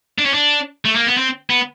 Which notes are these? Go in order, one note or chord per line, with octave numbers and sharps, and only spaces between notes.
D4
C#4
D4
A3
A#3
B3
C4
B3